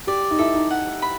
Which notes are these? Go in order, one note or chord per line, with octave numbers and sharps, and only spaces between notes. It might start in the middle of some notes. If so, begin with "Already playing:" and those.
G4 D5
D#4
E4 A4
D#4
F#5
B5